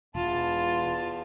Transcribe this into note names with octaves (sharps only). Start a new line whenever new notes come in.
E1 E2 F4 A5